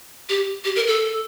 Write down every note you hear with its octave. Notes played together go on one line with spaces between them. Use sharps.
G4
G4
A#4
A4